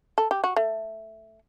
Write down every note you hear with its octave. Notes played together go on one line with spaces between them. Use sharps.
A4
G4
F#4
A3